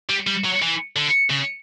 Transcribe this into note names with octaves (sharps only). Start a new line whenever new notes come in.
G3
G3
F#3
E3
D3
C#3